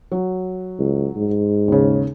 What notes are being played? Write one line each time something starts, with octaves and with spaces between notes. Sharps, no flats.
F#3
C#2
G#2
D#2 C#3